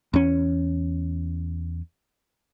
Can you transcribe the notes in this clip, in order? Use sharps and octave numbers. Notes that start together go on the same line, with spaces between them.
E2 C#4